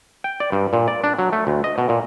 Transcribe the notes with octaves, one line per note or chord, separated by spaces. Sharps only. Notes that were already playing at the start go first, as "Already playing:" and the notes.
G5
D5
G2
A#2
D5
D4
F#3
A3
D2
D#5
B2
A#2